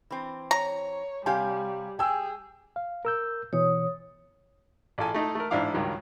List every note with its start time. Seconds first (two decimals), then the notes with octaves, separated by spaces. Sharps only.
0.11 E3 C4
0.51 C#5 A#5
1.26 C3 G3 G4 F5 G#5
1.99 G4 G#4 G5 G#5 E6
2.76 F5
3.05 A#4 E6 G6
3.53 B2 E3 C#5 D#6
4.98 A1 F4 A4 G#5
5.14 A3 D#4 E4 A4
5.35 A3 A#4
5.51 A1 G#2 D4 E4 F5 D6
5.74 C#2 G2 D#3 F#3